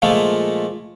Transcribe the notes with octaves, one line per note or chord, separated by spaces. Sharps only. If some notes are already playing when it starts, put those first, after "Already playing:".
A#2 F3 G#3 A3